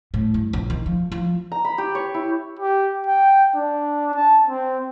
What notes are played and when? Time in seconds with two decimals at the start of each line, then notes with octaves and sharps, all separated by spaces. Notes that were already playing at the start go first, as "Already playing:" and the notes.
0.14 A2
0.34 G2
0.53 A#1
0.70 D#3
0.86 F3
1.12 F3
1.52 A#5
1.65 B5
1.78 G4
1.95 C#5
2.14 E4
2.59 G4
3.07 G5
3.55 D4
4.15 A5
4.49 C4